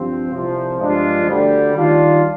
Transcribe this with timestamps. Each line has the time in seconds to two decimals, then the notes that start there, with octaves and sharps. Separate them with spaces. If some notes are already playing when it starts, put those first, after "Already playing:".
Already playing: G2 F3 C4 G4
0.31 C2 C3 F3
0.80 G2 F3 G#3 D4 F4
1.27 D2 D3 G3
1.76 D#3 G3 D4 F4